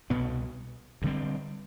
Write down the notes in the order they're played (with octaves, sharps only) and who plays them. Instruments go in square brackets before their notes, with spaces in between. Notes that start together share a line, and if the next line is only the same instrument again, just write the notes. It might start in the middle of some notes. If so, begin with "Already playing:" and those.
[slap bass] C2 B2 B3
D2 D3 G3 C4